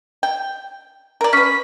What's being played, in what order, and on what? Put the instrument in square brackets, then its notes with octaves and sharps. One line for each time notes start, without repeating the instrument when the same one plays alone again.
[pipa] G5
A#4 D5
[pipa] C#4 B4 [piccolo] B6